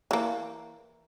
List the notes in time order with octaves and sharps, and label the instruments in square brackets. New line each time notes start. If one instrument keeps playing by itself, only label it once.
[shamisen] E3 A#3